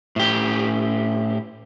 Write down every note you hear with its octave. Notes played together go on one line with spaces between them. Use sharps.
A2 G4